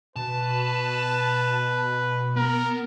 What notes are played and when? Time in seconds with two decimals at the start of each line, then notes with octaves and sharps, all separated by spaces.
0.16 B2 B4 A5
2.36 B3 A#4